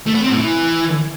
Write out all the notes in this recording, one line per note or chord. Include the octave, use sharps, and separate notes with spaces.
A3
B3
C4
A2
E3